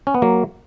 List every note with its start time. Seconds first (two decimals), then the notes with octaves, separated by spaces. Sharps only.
0.07 C#4
0.14 B3
0.22 F#3 A#3